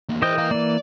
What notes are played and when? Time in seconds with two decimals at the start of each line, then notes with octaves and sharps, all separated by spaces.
0.09 E2 A#3
0.22 E3 A#4 C5 D#5 G5
0.38 A#4 F5
0.51 E3 A#3 D5